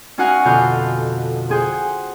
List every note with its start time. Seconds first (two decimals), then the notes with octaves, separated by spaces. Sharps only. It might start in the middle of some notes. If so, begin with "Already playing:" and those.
0.18 C#4 D#4 F#4 F5 F#5 G#5
0.45 F2 B2 D3 F5 G6
1.49 C4 G#4 C5 F#5